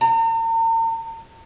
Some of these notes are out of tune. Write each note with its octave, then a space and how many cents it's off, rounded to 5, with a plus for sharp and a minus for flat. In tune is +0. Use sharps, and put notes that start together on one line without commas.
A#5 -45